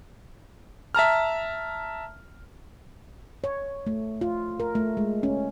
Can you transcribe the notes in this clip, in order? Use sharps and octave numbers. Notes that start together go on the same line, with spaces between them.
E5 A5 A#5 F6
C#5
A3
F4
A#4
A3
G#3
C#4